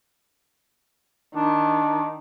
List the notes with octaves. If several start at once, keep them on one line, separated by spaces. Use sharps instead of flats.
D#3 D4